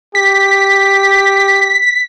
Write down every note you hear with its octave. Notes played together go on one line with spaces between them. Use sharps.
G4 B6